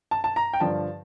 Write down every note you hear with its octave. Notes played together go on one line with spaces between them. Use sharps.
A5
A5
A#5
G5
G2 D3 F3 A5